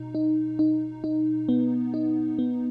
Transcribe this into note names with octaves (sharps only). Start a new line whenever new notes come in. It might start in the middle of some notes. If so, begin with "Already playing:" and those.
Already playing: B2 D#4
D#4
D#4
D#4
B3
D#4
B3